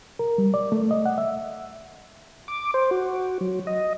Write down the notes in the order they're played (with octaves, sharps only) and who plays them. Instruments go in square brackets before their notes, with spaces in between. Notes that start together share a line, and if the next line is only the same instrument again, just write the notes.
[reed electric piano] A#4
G3
D5
A3
D#5
F#5
E5
[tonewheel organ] D6
C5
F#4
F#3
D#5